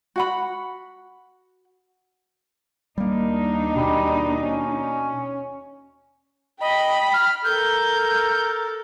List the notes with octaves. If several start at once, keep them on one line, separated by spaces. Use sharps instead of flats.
F#4 F#5 B5
D#2 G3 A#3 D4 D#4
B2 G3
C#4
D#5 G5 B5
F6
A4 A#4 G6